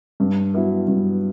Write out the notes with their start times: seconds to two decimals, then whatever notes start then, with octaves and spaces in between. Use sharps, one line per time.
0.20 G2
0.54 F#3 B3 E4 B4
0.88 G2